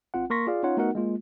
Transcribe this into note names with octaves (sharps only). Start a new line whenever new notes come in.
G#1 C4 F4 F#5
A#3 A#4 C6 C#6 A#6 B6
F4 G#4 D5 F5
C#4 D#4 F4 C#5 F#5
A3 B3 D#4 F#4 A#4 F#5
G#3 A#3 F4